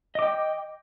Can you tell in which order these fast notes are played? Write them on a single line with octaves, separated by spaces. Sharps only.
D#5 D6 G5